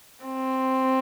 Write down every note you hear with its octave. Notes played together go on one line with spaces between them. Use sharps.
C4